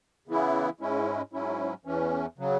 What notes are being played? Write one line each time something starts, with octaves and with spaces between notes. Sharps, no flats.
C#3 E3 B3 E4
G#2 G#3 C#4 E4
G#2 F#3 C#4 E4
E2 E3 C#4
C#3 F#3